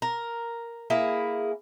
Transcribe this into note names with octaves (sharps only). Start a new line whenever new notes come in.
A#4
A#3 E4 G#4